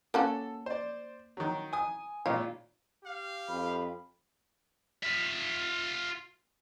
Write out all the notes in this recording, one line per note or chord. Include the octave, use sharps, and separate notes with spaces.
A#3 C#4 F#4 A4
C5 D5
D#3 F#3
G#5 D#6
G#1 A#2 F4 C#5
G4 F5
F2 B5
F4 E5